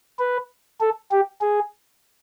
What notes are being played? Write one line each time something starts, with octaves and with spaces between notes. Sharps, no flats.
B4
A4
G4
G#4